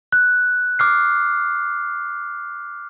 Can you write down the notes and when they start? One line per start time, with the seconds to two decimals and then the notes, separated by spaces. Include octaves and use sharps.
0.12 F#6
0.79 D6 F6 C7